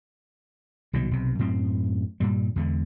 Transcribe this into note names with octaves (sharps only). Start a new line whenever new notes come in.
C2 B2 D#3 F#3
B1 C3
F#2 A2 C4
G2 A#2 G3
E2 D3 G#3